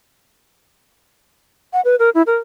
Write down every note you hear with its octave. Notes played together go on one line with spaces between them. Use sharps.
F#5
B4
A#4
E4
A#4